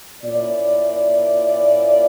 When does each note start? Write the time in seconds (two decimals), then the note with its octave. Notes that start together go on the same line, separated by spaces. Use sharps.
0.24 A#2 A#3 C#4 E4 D5